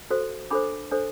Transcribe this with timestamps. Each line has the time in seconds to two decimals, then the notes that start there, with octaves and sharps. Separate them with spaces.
0.11 F#4 A4 C5
0.51 D4 A4 C5 B5 D6
0.91 D4 A4 C5